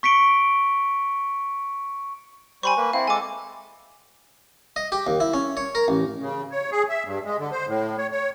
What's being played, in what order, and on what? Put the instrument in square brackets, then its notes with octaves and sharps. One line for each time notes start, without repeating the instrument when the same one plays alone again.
[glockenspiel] C#6 B6 C#7 D7 G7
[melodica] G3 C5 [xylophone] G#5 B5 C#6
[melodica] A#3 B4
[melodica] C4 E4 [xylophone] F5
[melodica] G#3 A4 [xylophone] G#5 D6
[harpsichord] D#5
G4
D#2
E4
C#4
C#5
A#4
A1
[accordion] C#3
C#5
G#4
E5
G2
G#3
D3
C5
A2
C#5
C#5